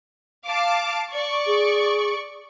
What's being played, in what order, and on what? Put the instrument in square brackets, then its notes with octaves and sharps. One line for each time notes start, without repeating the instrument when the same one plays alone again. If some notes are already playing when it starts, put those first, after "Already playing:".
[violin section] F5 A5 D6
D5 C#6
[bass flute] G#4